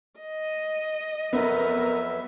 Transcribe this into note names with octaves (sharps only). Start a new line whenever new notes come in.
D#5
F2 F#3 B3 A#4 E5